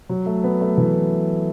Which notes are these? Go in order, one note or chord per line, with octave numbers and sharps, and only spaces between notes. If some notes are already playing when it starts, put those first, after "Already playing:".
F#3
A3
B3
A3
E3